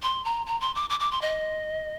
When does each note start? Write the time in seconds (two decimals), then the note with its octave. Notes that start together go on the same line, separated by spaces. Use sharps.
0.03 C6
0.25 A#5
0.46 A#5
0.61 C6
0.75 D6
0.90 D6
1.00 D6
1.11 C6
1.22 D#5